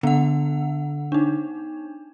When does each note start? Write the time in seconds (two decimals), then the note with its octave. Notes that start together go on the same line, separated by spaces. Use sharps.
0.03 D3 B3 F#5
1.12 D4 D#4